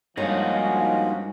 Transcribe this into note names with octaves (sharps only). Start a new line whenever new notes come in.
G2 F3 G#3 A#3 C#4 D#4 F#4 C#5